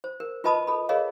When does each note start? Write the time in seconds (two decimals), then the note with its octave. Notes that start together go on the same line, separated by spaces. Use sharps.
0.04 C5
0.20 A#4
0.44 F4 B4 D#5 A5 B5 D#6
0.67 A4 B5
0.89 G#4 A#4 C#5 D#5 F5